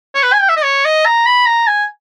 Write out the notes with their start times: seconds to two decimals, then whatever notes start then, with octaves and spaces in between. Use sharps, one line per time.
0.15 C#5
0.23 B4
0.33 G#5
0.41 G5
0.49 E5
0.57 D#5
0.64 C#5
0.85 D#5
1.06 A#5
1.26 B5
1.47 A#5
1.67 G#5